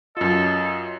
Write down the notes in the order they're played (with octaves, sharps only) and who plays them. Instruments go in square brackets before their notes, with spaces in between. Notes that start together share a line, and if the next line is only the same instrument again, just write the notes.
[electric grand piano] F#2 F4 [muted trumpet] A4 [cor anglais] D#5